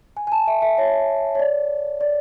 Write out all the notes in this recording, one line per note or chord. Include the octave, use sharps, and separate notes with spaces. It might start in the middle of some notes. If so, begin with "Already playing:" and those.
G#5
G#5
A5
E5
E5
C#5
C#5
D5
D5